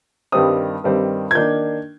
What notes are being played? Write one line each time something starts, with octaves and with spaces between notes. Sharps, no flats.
G2 D#3 G3 C4 D#6
G2 D#3 G3 C4
G#6
D#3 A#3 D4 G6